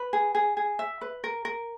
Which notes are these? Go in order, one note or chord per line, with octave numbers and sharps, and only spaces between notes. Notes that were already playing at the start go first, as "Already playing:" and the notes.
Already playing: B4
G#4
G#4
G#4
E5
B4
A#4
A#4